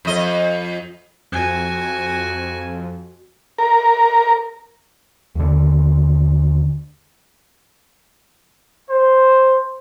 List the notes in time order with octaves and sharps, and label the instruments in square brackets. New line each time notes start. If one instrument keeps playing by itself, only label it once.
[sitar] F2 D#5
[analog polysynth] F2 [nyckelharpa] F#4 G#5
[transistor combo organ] A#4
[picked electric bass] D#2 D3
[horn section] C5